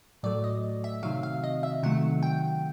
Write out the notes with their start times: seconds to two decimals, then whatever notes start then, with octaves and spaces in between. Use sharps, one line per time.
0.23 A2 F#3 A3 D5
0.44 D#5
0.84 E5
1.03 C3 D#3 F#3 F5
1.23 F5
1.44 D#5
1.63 E5
1.83 C3 D#3 F#3 A3 F#5
2.23 G5